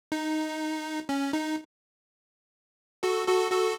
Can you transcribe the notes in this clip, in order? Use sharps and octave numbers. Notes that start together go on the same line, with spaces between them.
D#4
C#4
D#4
F#4 A4
F#4 A4
F#4 A4